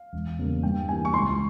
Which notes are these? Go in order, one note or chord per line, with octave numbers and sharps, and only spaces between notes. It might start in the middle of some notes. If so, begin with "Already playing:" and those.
Already playing: F5
E1
E2 C#3 G3 A#3
G2 G5
E3 G3 A#3 G#5
C#6
C#2 C6